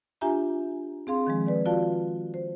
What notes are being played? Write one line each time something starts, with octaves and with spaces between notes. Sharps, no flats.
D4 F4 G4 E5 G#5 A#5
C4 G#4 F5 C6
D#3 F3 G#3
B4 D5
F4 F#4 D5 F5 A5
C5